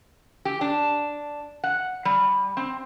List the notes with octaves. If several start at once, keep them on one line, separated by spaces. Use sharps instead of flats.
G4
D4
F#5
G3
C4